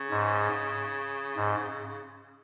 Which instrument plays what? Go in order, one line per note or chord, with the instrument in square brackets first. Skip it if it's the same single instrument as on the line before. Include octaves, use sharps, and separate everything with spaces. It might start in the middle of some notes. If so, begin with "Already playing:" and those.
Already playing: [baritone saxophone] C#3
[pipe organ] G#2
G#2